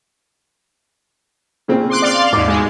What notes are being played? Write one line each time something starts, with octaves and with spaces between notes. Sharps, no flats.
A#2 C#3 C4
C6 D6 F#6
D5 F5 C6
D#2 G#2 D6
B2 G#3